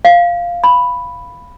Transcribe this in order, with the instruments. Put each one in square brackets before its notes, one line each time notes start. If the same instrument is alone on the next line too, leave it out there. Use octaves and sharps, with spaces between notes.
[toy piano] F5
B5